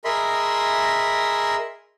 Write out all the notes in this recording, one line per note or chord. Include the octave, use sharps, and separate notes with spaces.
G#4 A#4 D#5 E5 B5 C6